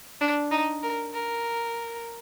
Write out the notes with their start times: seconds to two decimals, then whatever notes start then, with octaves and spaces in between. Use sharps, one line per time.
0.21 D4
0.51 D#4
0.83 A#4
1.14 A#4